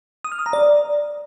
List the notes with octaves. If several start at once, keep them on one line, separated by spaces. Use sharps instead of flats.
D#6
F6
D#6
A#5
D5